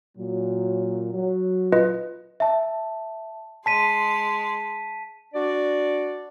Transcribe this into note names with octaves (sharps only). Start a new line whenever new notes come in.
A#2 F#3
F#3
F4 B4 D#5
E5 A5
G#3 A5 C6 B6 D#7
D4 F#4 D5